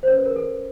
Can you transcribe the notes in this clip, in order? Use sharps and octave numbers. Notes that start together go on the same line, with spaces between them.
C5
C#4 C#5
B4
A#4
A4